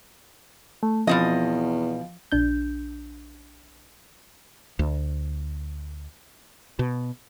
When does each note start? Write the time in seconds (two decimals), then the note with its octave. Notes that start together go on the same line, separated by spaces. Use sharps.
0.83 A3
1.07 E2 B2 F3 C4 D#5
2.32 A#1 D4 G6
4.79 D2
6.79 B2